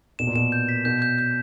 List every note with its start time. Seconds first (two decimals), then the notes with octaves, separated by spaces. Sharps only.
0.19 B2 E7
0.27 A#2
0.35 B2 E7
0.52 G6
0.69 B6
0.85 B2 G6
1.02 G6
1.18 G6